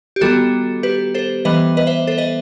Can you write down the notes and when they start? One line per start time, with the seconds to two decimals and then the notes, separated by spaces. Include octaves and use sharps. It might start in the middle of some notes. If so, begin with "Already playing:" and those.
0.16 G4
0.21 D#3 G3 B3 F#4 A4
0.83 G4 B4
1.15 A4 C5
1.45 E3 G3 B3 B4 D#5
1.77 B4 D#5
1.87 C5 E5
2.07 A4 C5
2.18 B4 D#5